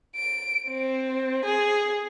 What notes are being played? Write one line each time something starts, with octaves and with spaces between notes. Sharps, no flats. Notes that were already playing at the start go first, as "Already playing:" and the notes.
D7
C4
G#4